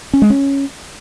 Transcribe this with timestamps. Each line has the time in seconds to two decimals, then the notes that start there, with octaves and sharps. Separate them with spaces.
0.13 C#4
0.22 G#3
0.30 C#4